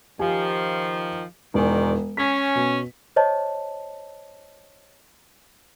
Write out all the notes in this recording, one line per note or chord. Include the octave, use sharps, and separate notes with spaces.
D#3 F3 G4 G#5
E1 G#2 D#3 D5 G#5
C#4 B6
B2
C5 C#5 D#5 A5